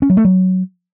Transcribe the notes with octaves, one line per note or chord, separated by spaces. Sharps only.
C#4
F#3
A3
F#3